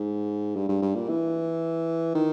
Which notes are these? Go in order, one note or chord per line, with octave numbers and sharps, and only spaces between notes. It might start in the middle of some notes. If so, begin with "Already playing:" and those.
Already playing: G#2
G2
G2
G2
A#2
E3
D#3